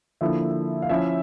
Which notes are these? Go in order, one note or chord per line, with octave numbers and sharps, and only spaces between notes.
D3 F3 A#3 E4 E5
F5
F3 C#4 E4 E5